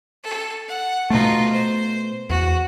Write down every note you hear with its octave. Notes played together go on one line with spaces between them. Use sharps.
A4
F#5
B2 A3 D#4 F4
C5
E2 F#4